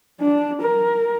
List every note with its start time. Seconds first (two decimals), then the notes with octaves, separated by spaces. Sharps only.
0.20 D4
0.62 A#4